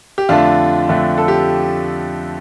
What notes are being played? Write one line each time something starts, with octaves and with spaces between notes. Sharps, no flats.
G4
F2 D3 A3 D4 F4
F2 D3 A3
A4
G4